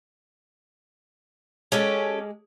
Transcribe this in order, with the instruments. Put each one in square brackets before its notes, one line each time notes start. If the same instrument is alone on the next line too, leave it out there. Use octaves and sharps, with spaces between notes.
[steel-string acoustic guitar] G#3 [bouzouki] C#4 G4 A4